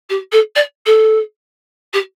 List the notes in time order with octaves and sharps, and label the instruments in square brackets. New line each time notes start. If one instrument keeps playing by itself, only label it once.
[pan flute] G4
A4
D5
A4
G4